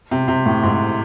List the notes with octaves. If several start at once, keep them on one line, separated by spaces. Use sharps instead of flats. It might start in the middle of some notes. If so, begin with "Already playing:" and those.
C3
C3
A2
G#2